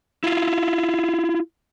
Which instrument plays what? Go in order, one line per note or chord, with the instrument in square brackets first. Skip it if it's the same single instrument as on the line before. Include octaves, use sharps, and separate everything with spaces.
[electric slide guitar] E4 F4